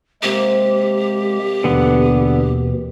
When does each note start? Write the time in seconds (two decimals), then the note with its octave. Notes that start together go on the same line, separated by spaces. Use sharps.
0.22 C3 G#3 A#3 G4
1.64 D#2 B2 D3 E3 B3